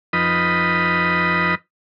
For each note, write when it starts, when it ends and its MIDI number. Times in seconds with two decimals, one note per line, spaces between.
0.13 1.55 41
0.13 1.55 53
0.13 1.55 63
0.13 1.55 71
0.13 1.55 75
0.13 1.55 83